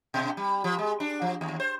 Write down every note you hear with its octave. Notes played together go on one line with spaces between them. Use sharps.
B2
G3
F3
G#3
D4
F3
D#2
C5